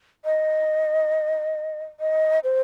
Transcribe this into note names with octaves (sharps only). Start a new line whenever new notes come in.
D#5
D#5
C5